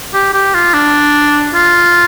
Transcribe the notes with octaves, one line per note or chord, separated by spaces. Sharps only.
G4
G4
F4
D4
F4